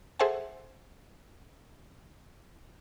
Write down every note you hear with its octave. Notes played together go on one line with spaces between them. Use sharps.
G#4 A4 C5 E5 F#5 G#5